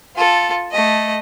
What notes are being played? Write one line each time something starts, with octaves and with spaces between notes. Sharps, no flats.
F4 A4
A3 D#5